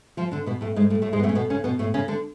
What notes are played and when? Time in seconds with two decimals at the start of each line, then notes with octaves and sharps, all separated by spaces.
0.17 F3 F4
0.31 D3 D4
0.46 B2 B3
0.61 A2 A3
0.76 G#2 G#3
0.90 A2 A3
1.02 A2 A3
1.13 G#2 G#3
1.19 B3
1.23 A2 A3
1.29 C#4
1.35 B2 B3
1.50 C#3 C#4
1.64 B2 B3
1.79 A2 A3
1.94 C#3 C#4
2.08 D3 D4